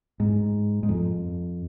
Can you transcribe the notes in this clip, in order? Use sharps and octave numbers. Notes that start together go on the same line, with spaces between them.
G#2
G#2
F2